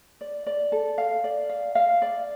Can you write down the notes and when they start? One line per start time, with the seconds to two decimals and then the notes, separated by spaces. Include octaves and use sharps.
0.21 D5
0.46 D5
0.72 A4
0.98 F5
1.24 D5
1.49 F5
1.75 F5
2.02 D5